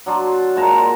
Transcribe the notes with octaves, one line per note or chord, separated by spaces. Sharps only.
F#3 D4 F4
A#2 G#3 A5 A#5